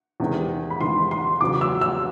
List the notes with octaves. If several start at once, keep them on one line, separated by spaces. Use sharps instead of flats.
E2 C3 D#3 G#3
B5
E2 C3 D#3 G#3 C6
C6
E2 C#3 F#3 D6
E6
E6